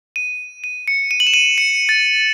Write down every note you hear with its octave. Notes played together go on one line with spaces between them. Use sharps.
D#7
D#7
C#7
D#7
F#7
E7
D#7
C#7
A6